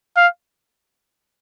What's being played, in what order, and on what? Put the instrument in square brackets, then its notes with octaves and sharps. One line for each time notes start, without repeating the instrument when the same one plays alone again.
[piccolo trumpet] F5